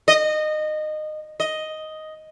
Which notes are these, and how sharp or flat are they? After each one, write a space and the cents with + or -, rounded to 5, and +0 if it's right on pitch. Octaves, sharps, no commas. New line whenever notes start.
D#5 -20
D#5 +5